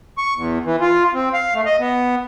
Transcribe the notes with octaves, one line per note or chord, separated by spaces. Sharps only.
C#6
E2
E3
F4
C4
F5
A3
D#5
B3